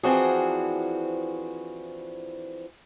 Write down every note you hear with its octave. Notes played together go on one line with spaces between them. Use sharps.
E3 F3 C4 D4 F#4 G#4